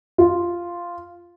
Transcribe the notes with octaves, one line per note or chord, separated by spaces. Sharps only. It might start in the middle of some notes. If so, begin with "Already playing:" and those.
F4